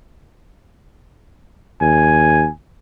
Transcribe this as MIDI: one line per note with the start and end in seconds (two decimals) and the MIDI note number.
1.81 2.46 39
1.81 2.50 80